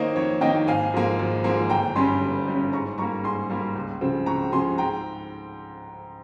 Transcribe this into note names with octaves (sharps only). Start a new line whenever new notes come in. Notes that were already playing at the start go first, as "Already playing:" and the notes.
Already playing: D#3 A#3 D#4 C5 C#5 D#5
F2 C#5
D#3 A#3 D#4 D#5 G5
G#1 F5 G#5
G#2 F3 A#3
G#1
G#2 F3 A#3
G1 G5 A#5
G2 G3 C#4 G#5 C6
G1
G2 G3 C#4
G#2 A#5 C#6
G3 A#3 A#5 C#6
G#2 G#5 C6
G3 A#3
C#2
C#3 F3 C4
C#2 A#5 C#6
C#3 F3 C4 G#5 C6
G#2 G5 A#5